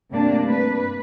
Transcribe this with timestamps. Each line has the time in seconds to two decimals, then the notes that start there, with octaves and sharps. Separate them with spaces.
0.11 C3 G3 A3 A#3 D4
0.48 B4